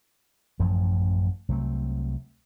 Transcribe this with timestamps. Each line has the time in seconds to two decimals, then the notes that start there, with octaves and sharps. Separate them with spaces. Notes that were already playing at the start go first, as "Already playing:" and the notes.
0.60 A1 F#2 F3
1.49 C2 F#3 A3 C4